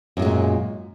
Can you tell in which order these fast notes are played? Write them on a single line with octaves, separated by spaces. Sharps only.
F#2 C#3 G#3 A#2